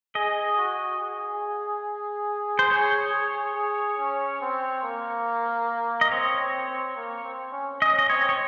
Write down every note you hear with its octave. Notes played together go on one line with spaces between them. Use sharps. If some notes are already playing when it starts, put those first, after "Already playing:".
G#4 D#5
F#4
G#4
C5
G#4 C#5
G#4
G#4
C#4
C4
A#3
D#5
C4 C#5
C4
C4
A#3
C4
C#4
C#4 D#5
D#5
C4 C#5
C#5